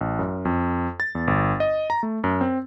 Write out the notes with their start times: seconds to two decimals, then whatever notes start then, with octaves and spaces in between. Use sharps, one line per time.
0.01 A1
0.19 F#2
0.45 F2
1.00 A6
1.15 E2
1.27 G1
1.60 D#5
1.90 A#5
2.03 A3
2.24 F#2
2.41 C4